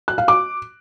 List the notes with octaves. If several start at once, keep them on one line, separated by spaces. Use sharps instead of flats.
F#6
F5
D6